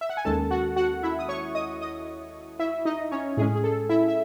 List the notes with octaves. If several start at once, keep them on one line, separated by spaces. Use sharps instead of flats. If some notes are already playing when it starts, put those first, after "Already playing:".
E5
F#5
G#5
D#2 D#3 G#3 C#4 A4 A5
F#4 F#5
F#4 F#5
E4 E5
D#6
C#5 C#6
D#5 D#6
D#5 D#6
E4 E5
D#4 D#5
C#4 C#5
A2 G#3 C#4 G#4
G#4
A4
E4 E5
E5